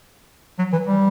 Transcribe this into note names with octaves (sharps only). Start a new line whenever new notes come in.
F#3
E3
G3